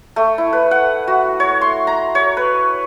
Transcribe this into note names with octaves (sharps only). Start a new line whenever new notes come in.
A3
E4
B4
F#5
F#4
C#5
C6
A#5
C#5
B4